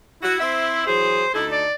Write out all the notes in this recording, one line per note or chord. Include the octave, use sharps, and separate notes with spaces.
E4 F#4
C4 C5 E5
E3 F#3 G#4 C5
D2 D#4 E4 A4
D5